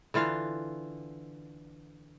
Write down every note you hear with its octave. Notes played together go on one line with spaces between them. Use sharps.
D3 E3 F4 F5